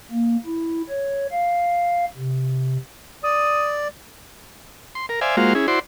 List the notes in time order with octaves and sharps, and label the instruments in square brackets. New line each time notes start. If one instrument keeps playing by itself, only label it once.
[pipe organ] A#3
E4
C#5
F5
C3
[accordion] D5 [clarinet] D#6
[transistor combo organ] C6
A#4
C5 D5 E5 F5 G#5
G#3 A#3 F4 F#4 C5 F5
C#4 E4 G#4
E4 F#4 C5 D5 C6